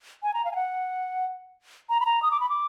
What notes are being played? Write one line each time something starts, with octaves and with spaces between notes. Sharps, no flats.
G#5
A#5
F5
G#5
F#5
A#5
B5
A#5
D#6
D6
B5
D6